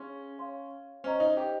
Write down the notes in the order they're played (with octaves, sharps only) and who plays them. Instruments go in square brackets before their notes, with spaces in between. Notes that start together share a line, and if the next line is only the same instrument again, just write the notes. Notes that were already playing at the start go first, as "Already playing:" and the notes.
Already playing: [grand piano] C#4 [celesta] G#4 C#5 F5 C6
[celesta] C#5 F5 C6
[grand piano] C#4 [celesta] C5 D#5 A#5
[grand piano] D#4
G4